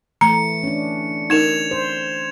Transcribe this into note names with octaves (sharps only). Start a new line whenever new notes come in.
E3 A3 A#5 C#7
C#4 D4
D#4 A#4 G#6 E7 F7
C5